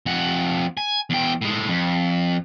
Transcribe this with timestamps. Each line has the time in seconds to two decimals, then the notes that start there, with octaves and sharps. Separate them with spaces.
0.06 F2 F#5
0.77 G#5
1.10 E2 G5
1.42 A2 G#3
1.68 F2